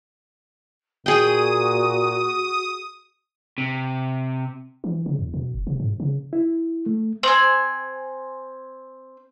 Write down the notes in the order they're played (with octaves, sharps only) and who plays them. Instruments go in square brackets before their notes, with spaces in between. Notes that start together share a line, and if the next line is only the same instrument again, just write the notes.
[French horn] A#2 [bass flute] F#4 [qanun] G#4 G5 [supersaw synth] D#6
[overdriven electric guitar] C3
[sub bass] E3
C#3
E2
B2
F1
C3
G#2
C#3
[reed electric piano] E4
A3
[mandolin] C4 G#5